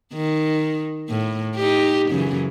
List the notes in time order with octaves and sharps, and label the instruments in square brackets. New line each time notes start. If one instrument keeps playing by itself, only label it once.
[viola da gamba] D#3
A2
D#4 G4
F#2 C#3 E3